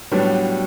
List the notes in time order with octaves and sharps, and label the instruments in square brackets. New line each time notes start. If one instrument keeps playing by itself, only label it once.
[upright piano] A2 G3 B3 D4 [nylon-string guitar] F#3